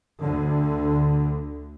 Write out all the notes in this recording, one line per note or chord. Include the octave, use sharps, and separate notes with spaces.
D2 D3